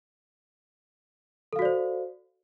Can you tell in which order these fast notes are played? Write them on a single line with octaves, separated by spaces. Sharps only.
A4 F5 F#4 D5 C5